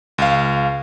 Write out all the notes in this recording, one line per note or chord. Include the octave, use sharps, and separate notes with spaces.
C#2 F5